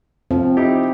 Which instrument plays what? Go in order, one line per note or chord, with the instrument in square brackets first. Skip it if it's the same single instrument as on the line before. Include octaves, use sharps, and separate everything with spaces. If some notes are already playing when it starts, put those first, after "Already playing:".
[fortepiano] F3 [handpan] C4
[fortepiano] D#4 E4 G4